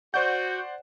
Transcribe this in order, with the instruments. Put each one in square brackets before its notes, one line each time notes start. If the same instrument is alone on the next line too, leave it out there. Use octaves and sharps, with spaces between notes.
[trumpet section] F#4 [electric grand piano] C5 D5 F#5 [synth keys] G6